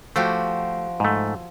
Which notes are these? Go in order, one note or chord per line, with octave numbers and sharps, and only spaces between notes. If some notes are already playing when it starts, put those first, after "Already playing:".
F3 A3 F#4 G4
G#2 A3